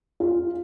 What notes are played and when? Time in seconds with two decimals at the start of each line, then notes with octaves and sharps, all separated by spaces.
0.20 F4